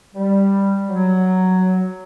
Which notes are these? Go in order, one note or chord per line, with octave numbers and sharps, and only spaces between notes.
G3
F#3